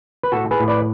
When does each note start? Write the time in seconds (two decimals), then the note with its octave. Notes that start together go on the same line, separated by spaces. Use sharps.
0.23 B4
0.32 A2 F#4 A4
0.51 G#4 B4
0.60 A2
0.68 B4 D5